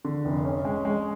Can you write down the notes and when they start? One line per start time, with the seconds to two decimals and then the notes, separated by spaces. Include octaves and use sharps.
0.05 D3
0.25 F1
0.45 C#4
0.65 G#3
0.85 G#3